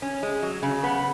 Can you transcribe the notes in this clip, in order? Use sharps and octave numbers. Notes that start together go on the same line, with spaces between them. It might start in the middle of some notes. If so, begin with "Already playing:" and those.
C#4
G#3
F#3
C#3
B3